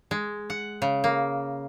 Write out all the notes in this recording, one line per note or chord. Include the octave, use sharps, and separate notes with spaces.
G#3
F#5
C#3
A#3